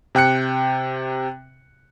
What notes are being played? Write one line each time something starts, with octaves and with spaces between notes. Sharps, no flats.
C3 G5 F#6 C#7